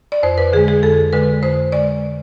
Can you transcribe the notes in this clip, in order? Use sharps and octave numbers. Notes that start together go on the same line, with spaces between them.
D5
F2 C5
B4
D3 G#3 G#4
G#4
F2 A4
D3 G#3 B4
F2 C5
D3 G#3 D5